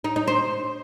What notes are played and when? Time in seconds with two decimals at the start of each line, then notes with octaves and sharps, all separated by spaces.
0.04 D#4
0.16 D#4
0.28 C5